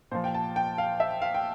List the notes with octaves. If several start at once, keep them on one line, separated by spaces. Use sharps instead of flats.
A#2 F3 C5
G5
A5
G5
F5
E5
F5
G5